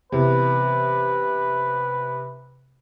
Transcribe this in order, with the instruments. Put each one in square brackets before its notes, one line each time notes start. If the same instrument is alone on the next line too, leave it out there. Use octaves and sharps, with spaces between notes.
[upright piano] C3 E3 B3 [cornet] B4